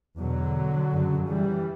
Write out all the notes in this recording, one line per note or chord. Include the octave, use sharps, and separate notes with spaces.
E2 B2 D3 F#3
F#2 C#3
E3 G3